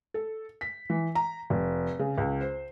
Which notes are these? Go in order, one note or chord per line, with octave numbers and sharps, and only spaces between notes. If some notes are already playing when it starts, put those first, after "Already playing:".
A4
B6
E3
A#5
F1
C#3
C#2
C5